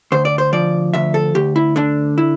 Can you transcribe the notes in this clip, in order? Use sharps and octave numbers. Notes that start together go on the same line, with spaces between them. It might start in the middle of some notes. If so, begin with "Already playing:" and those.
D2 C5
D5
C5
F3 D5
D2 E5
A4
D2 G4
E4
D3 D4
E4